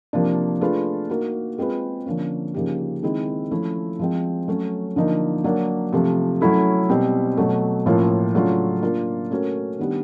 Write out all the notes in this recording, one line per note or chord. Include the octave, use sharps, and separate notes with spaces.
C3 F3 A#3 D4
A3 D4 F4 G#4 B4
A#3 D#4 F#4 A#4
G#3 C4 F4 G#4 B4
D3 F3 A#3 C#4
C#3 F3 A#3 D#4 G4
D#3 G#3 C4 E4
F3 A3 C#4 E4
F3 G#3 C4
F#3 A3 C#4
D3 F3 A#3 D#4
F#3 A#3 D4
C3 F3 A3
F#3 A3 C#4 E4 A4
B2 G3 C4
B2 F#3 A3
A2 F3 A#3 C#4 F4
C#3 F#3 A3 D4 F4
A#3 D4 F4
A3 C#4 F#4 A#4
D#3 G3 B3 D4 G4